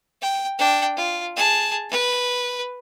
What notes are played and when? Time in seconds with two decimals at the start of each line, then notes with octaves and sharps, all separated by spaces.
0.22 G5
0.58 D4 G5
0.97 F4
1.36 G#4 A5
1.89 B4